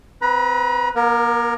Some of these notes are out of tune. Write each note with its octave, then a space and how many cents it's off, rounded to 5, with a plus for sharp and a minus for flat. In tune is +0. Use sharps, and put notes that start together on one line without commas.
C4 -25 B4 +0 A#5 +40
A#3 +45 A#4 +0